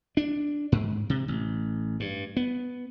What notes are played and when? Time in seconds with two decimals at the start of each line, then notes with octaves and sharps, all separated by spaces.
0.17 D4
0.72 G#2
1.10 C3
1.28 A1
2.00 G2
2.37 B3